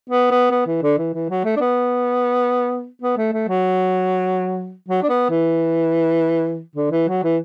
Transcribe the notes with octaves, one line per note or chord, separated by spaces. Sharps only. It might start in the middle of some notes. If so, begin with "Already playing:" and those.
B3
B3
B3
E3
D3
E3
E3
F#3
A3
D4
B3
B3
A3
A3
F#3
F#3
D4
B3
E3
D3
E3
F#3
E3